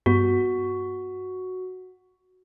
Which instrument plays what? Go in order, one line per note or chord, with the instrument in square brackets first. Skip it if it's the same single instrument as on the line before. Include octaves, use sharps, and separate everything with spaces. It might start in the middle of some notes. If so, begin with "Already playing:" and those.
[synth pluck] G2 B3 [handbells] F#4